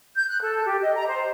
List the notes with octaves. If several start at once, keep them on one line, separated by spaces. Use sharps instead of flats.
G6
F#6
A4
G4
D#5
A#5
C5